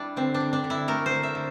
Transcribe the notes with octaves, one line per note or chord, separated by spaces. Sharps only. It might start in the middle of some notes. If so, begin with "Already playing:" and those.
Already playing: G3 D4 E4
D3 C4
D4
D3
D4
D3
E4
A3 A#4
C5
D3
E5
D3